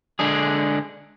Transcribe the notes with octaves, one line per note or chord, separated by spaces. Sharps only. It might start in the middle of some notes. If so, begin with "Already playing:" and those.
D3 G#3 D4 G#4